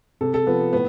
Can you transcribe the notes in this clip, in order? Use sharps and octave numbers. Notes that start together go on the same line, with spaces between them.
C3 A4
A4
F3 B3
A2 B3